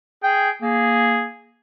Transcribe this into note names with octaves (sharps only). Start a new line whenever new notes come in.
G#4 G5
A#3 G#4